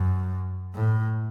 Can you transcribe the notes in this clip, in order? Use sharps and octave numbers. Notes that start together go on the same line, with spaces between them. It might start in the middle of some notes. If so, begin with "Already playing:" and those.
Already playing: F#2
A2